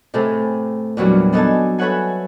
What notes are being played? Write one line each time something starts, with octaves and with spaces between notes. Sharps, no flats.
A2 C3 A3 G#4 A4
E2 A#2 F#3 G3 D4
B3 D4 D#4 A4 G#5 A5
A4 B4 C#5 E5 F#5 G#5